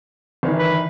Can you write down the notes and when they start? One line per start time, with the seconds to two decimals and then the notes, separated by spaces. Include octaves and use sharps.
0.43 G1 D#3 E3
0.59 B4